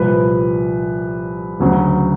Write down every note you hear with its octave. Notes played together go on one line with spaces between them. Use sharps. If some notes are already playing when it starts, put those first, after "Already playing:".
Already playing: C2 A#2 F3 B4
D2 C#3 F#3